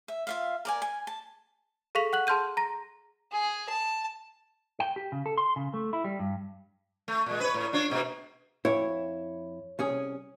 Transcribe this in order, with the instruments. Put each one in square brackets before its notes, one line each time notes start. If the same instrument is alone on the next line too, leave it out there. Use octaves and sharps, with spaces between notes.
[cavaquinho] E5
F4 E5 F5
A#4 D5 G#5
G#5
A5
[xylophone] G#4 A4 F5 C#6 B6 F7
F#5 F#6 F#7
G#4 A5 C6 F6 G6 D#7
A#5 A#6
[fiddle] G#4
A5
[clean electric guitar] G5
G4
C#3
A4
C6
C#3
A3
E4
G3
G2
[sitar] A3
A#2 G#3
B4 C#5
A2
D4 F4 C#5
G#2 B2 A#3
[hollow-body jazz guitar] F2 E4 [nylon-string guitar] C#5
[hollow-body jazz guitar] C2 C#4 G#4